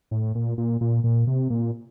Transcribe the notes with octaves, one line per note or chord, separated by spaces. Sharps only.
A2
A#2
A#2
A#2
A#2
C3
A#2